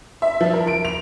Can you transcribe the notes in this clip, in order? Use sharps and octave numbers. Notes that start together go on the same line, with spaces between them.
E5
F3
A#4
D7
F7